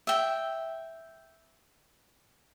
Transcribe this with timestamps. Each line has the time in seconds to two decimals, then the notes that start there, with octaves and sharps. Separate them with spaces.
0.07 E5 G5